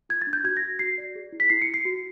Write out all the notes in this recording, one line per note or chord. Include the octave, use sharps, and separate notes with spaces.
F4 G#6
A6
D4
G6
F#4 G#6
A#6
F#4
F#4 C7
D5
G#4
E4
B6
E4 C7
C#7
E4
C7
F#4